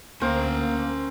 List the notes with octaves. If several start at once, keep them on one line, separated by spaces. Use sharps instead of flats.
D2 A#3 C#4 A#4 C5 G5